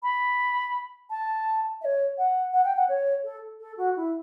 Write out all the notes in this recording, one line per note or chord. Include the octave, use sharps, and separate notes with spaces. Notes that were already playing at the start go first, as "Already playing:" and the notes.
B5
A5
E5
C#5
F#5
F#5
G5
F#5
C#5
A4
A4
F#4
E4